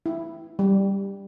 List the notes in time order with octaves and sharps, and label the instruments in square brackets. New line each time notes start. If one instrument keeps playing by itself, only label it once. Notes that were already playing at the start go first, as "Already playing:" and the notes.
[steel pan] E4
G3